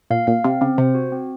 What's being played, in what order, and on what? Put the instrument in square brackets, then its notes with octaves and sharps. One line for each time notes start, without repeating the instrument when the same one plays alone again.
[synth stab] A#2 [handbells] F5
[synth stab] A#2 [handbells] F5
[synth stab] C3 [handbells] C4
[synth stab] C#3 [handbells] C4
[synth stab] C3 [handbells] C5
[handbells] F#4
C4